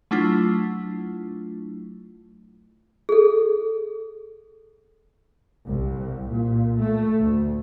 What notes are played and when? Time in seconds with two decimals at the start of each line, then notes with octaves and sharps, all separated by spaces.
0.11 F#3 A3 D4 E4 F4
3.09 G#4 A4
5.67 C2
6.28 A#2
6.78 A3
7.18 D2